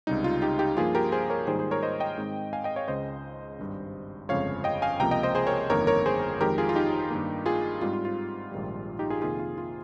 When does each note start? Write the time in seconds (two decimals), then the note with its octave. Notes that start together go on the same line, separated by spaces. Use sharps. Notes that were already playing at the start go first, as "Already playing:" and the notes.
0.07 C#2 C3 G3 D#4
0.24 F4
0.42 D#4 G4
0.59 D#4 G4
0.77 G2 F3 A#3 F4 G#4
0.95 G4 A#4
1.12 G#4 C5
1.30 A#4 C#5
1.47 G#2 D#3 G3 A#3 G#4 C5
1.59 G#4 C5
1.71 A#4 C#5
1.83 C5 D#5
2.00 D#5 G5
2.18 G#2 D#3 G#3 C4
2.53 F5 G#5
2.64 D#5 G5
2.76 C#5 F5
2.88 C#2 C#3 G#3 C5 D#5
3.59 G#1 G2 G3
4.29 G1 F2 C#3 F3 G#3 C#5 F5
4.64 D#5 G5
4.82 F5 G#5
4.99 C#2 C3 F3 A#3 G5 A#5
5.11 D#5 G5
5.23 C5 D#5
5.35 G#4 C5
5.47 A#4 C#5
5.70 G1 F2 D#3 A#3 A#4 C#5
5.87 A#4 C#5
6.06 G#4 C5
6.40 F2 D#3 G#3 G4 A#4
6.58 F4 G#4
6.69 F4
6.75 D#4 G4
7.10 G2 D#3 A#3
7.46 F4 G#4
7.81 G#2 G3 C4 F4
7.93 F4
8.05 F4
8.52 A#1 G#2 D#3 G3
8.99 D#4 G4
9.10 F4 G#4
9.22 F2 C3 D#3 A#3 F4 G#4
9.40 F4
9.58 F4